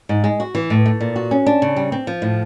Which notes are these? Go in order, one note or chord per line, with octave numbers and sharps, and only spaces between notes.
G#2
G#3
F#4
E3
A2
A3
A#2
F#4
C#4
D4
C#3
G3
C4
F3
A2